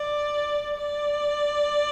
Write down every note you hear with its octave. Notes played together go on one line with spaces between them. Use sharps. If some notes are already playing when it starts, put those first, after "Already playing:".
Already playing: D5
D5